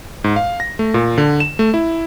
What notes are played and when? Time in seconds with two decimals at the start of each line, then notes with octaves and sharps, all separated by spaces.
0.24 G#2
0.36 F5
0.60 A#6
0.79 A3
0.94 A#2
1.18 D3
1.40 E7
1.59 A3
1.74 E4